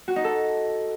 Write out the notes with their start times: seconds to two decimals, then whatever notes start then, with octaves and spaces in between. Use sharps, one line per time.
0.08 F#4
0.16 D#4
0.24 A4